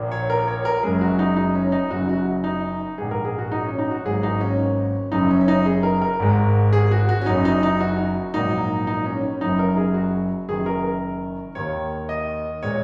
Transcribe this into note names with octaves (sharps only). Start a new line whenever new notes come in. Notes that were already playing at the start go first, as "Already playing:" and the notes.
Already playing: A#1 A#2 A#3
C#5
A#4
C#5
A#4
F#1 F#2 C#3 G#3 G#4
F#4
D#4
D#4
C#4
D#4
F#1 F#2 C#3 F#4
F#4
D#4
A#1 G#2 G#3 G#4
A#4
G#4
F#4
D#4
C#4
D#4
F#4
G#1 G#2 F#3 A#3 G#4
D#4
C#4
F#1 F#2 C#3 D#4
C#4
C#4
D#4
G#4
A#4
A#4
G#1 G#2 G#3
G#4
F#4
F#4
C#4
F#1 F#2 C#3 D#4
D#4
D#4
F#4
A#1 G#2 F#3 A#3 D#4
D#4
C#4
C#4
F#1 F#2 F#3 D#4
A#4
G#4
F#4
F#1 F#2 D#3 G#4
A#4
A#4
D#2 D#3 A#3 C#5
D#5
A#2 G#3 C#5